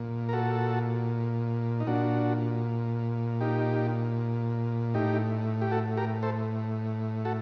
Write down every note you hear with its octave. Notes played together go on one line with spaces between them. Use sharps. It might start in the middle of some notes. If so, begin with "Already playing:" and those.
Already playing: A#2
A#4
F#4 A4
D#4
A#2 D4 F#4
D#4 G4
A2 D#4 G4
G4
F#4 A4
G4 A#4
A4 C5
F#4 A4